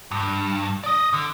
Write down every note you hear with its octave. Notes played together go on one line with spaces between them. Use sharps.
G2
D5 D#5
D3